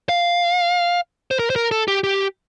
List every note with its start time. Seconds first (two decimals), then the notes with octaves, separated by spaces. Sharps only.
0.09 F5
1.31 C5
1.39 A#4
1.50 C5
1.56 A#4
1.71 A4
1.88 G4
2.04 G4